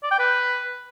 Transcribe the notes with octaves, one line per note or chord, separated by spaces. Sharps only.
D5
G5
B4